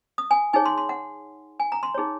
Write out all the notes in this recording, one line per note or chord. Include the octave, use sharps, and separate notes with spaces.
D#6
G#5
D#4 G#4 C#5 G#5
C6
C6
F#5
G#5
A#5
C6
D#4 G#4 C#5